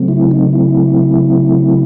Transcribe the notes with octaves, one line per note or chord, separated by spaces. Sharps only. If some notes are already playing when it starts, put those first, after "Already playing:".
Already playing: C#3 F#3 A3 C4
E4
D#4
E4